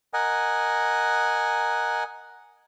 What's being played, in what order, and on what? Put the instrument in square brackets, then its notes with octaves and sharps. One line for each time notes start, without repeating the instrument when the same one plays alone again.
[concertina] A#4 D#5 F#5 G#5